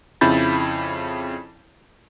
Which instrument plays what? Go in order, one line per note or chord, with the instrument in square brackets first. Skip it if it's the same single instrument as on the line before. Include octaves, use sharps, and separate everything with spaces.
[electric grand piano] F2 C#3 E4 B5 G6 A6